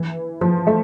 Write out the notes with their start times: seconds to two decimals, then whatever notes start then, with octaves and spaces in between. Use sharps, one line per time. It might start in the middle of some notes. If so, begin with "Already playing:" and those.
Already playing: E3
0.41 F3
0.67 A3